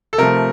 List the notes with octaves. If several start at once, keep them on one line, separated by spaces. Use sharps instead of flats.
A4
C3 F3 A3 A#4